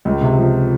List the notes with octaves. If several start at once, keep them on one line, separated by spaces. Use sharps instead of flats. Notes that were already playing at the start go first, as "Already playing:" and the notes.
C#2
C3
F3